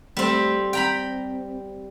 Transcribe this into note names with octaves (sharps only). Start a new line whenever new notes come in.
G3 A3 C4
C4 G5 A#5 B5